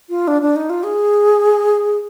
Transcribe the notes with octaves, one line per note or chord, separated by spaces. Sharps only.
F4
D4
D4
D#4
F4
G#4